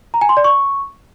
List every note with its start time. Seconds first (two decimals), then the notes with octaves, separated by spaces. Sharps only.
0.14 A#5
0.21 G#5
0.29 C6
0.37 D5
0.44 C#6